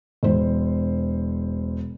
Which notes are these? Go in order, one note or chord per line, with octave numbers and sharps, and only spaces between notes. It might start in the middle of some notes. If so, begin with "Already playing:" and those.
E1 C5